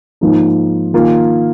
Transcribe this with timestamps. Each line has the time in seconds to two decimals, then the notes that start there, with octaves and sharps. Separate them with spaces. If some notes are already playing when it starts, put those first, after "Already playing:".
0.21 G#2 F3 A#3 D#4
0.93 D#3 A#3 F4